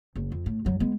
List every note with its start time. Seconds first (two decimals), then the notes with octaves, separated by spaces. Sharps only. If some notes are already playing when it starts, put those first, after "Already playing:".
0.16 F#1
0.32 F2
0.46 A2
0.65 F#2 F#3
0.80 G#3 B3